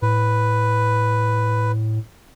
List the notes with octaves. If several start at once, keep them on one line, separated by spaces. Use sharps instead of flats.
A2 B4